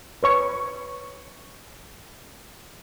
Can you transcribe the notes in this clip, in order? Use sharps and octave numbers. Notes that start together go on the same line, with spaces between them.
B4 C#5 C#6